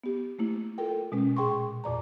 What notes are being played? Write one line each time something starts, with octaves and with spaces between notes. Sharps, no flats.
B3 G4
A3 A#3 E4
F4 A4 A#4 G5
B2 G#3 C#4
A#2 G#4 G5 C6 C#6
F2 A#2 D5 A#5